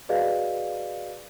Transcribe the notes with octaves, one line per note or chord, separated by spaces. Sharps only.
F#4 G#4 B4 D5 D#5 F5